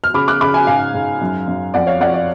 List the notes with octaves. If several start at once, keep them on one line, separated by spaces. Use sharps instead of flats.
F6
C#3 B5 D6
D6 F#6
C#3 B5 D6
G#5 B5
G#2 F5 G#5
G#2
F#2
F#2
F2 D5 F#5
C#5 F5
F2 D5 F#5
D5